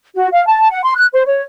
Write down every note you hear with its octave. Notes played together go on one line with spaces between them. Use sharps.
F#4
F5
A5
F#5
C6
F#6
C5
C#5